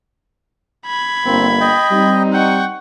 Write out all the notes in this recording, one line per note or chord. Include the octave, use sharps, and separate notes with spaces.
B5 G#6
G1 A#3 C4
D#5 G5
G3 C4 D#4
F#5 G5 C#6